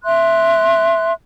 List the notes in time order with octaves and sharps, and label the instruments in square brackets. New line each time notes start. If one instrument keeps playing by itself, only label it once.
[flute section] E5 C6 F#6